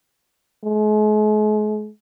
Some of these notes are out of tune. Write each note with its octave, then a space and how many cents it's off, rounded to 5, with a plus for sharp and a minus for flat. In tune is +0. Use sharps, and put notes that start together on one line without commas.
G#3 +40